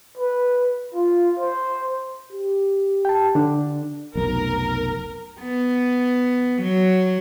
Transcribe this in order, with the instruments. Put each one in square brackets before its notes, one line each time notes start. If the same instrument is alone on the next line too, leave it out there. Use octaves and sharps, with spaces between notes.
[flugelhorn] B4
F4
C5
[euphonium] G4
[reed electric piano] G5 A5
D3 D4
[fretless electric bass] F1 B1 [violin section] A#4
[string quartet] B3
F#3